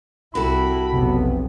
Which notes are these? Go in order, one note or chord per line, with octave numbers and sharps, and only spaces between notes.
C2 E4 F#4 G4 A4 B5
F1 B1 C3 B3